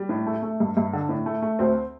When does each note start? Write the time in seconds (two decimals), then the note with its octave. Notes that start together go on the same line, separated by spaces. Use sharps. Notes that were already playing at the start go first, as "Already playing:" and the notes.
Already playing: G3
0.09 A2
0.26 A3
0.43 A3
0.60 G2
0.77 G2
0.93 D3
1.09 A2
1.26 A3
1.42 A3
1.59 D2 C4 C5